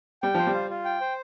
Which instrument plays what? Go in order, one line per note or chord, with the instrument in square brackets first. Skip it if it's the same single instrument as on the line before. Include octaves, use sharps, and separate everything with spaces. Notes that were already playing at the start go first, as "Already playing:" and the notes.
[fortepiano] G3 [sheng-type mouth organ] G5
[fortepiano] F3 [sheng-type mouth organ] C5
[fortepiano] G3
[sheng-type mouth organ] F4
F4
G5
C5